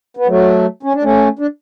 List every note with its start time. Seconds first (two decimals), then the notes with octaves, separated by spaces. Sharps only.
0.17 B3
0.27 F#3 A3
0.83 C#4
0.94 D4
1.03 A3 C#4
1.39 D4